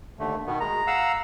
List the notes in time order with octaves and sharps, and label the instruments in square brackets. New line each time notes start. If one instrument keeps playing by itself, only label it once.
[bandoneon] D#2 D3 A3
B2 D#3 B3
[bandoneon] G#3 [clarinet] A#5
[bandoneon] F5 F#5 E6